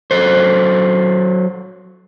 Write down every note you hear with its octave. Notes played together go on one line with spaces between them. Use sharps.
F#3 A4 C5